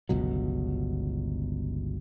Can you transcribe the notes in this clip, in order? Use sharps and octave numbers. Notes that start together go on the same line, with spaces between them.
G1 C#2 B2 F#3